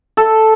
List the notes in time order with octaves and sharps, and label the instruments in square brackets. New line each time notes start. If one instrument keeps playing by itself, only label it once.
[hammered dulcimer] A4